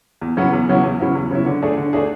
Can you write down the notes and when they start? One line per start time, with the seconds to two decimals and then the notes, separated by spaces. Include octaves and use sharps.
0.21 E2
0.37 C#3 F#3 B3 E4
0.53 E2
0.69 C#3 F#3 B3 E4
0.83 E2
1.00 C#3 F#3 B3 E4
1.15 E2
1.31 C#3 F#3 B3 E4
1.46 D3
1.62 A3 D4 G#4
1.77 D3
1.93 A3 D4 G#4